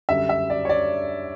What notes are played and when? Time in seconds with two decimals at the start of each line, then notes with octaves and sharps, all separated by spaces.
0.09 F#2 D3 G3 E5
0.29 E5
0.50 D5
0.65 C#5
0.69 D5